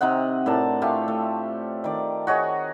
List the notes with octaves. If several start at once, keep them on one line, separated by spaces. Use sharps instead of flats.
C3 C4 D#4 F#5
A2 D4 A#4 A5
A3 F4 G4 F5
A3
D#3 D5
F#4 G#4 C#5 D#5